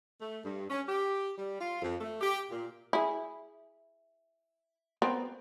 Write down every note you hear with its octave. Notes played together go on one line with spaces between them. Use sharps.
A3
G2
C#4
G4
G3
F4
F2
A3
G4
A#2
E4 G#4
B3 C4 A#4